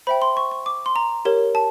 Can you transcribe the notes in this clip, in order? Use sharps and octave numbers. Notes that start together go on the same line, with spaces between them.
C5 E5 G5 B5
C6
C#6
C#6
D6
C6
A#5
G4 A#4 C#5
A5